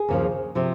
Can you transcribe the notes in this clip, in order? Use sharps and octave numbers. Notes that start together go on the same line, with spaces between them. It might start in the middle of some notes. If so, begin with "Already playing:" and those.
Already playing: G#4
D#2 C#3 F3
C3 F3